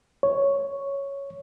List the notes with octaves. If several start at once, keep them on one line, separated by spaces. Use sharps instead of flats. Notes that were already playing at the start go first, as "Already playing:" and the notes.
C#5